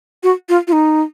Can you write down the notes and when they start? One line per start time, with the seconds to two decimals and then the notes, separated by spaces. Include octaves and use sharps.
0.23 F#4
0.49 F4
0.67 F4
0.72 D#4